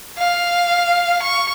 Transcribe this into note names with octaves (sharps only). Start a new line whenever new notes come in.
F5
C#6